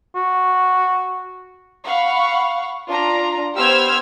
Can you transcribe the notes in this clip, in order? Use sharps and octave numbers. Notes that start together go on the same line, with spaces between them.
F#4
F5 F#5 B5 C#6
D4 F4 A#5
B3 G4 C5 E6 F6 G#6